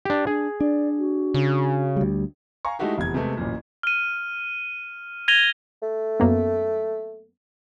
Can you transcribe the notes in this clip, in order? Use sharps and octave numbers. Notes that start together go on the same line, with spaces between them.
D4 G4
D4 G#4
D4 D5
F#4
C#3
D2 G3
F5 G#5 A#5 C#6
G#3 A3 D#4 E4 F#4 G4
F1 E2 G#6
C3 G#3 A3 B3
A1 F#2 A#2
F6 D#7
G#6 A#6 D#7 F7 G7
A3
F#2 A#3 B3